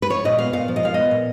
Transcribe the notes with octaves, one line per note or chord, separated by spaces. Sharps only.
B4
F3 C#5
A#2 D#5
B3 F5
A#2 F5
F3
D#5
A#2 F5
B3 D#5
A#2